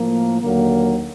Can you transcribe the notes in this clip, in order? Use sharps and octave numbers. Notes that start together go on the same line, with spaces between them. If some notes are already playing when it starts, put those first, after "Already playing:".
Already playing: A2 F3 A#3
D#2 D3 F#3 A#3